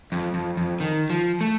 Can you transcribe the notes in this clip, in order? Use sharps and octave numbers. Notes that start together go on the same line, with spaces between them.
F2
F2
F2
D#3
F3
A3